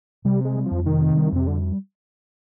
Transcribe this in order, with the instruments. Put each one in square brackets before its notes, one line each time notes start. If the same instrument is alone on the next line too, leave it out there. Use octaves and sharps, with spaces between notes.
[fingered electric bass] C3 [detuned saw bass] G3
[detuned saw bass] G#3 [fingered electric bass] C4
[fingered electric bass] G3
[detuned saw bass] F3
[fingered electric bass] F2
[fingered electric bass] C3 [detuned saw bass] D#3
[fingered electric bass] C4
G3
[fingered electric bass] F2 [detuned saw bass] C3
[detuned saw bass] D3 [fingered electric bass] G3